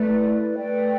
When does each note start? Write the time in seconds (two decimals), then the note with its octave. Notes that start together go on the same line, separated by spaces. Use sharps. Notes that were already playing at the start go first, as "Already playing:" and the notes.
Already playing: A3 E4 B4 D5
0.56 A3 B4 D5 G5